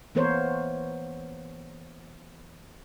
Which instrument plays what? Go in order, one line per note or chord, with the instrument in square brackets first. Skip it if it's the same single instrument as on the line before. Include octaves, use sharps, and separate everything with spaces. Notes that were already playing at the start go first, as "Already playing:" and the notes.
[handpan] E3 A#3 B3 A#4 C5 C#5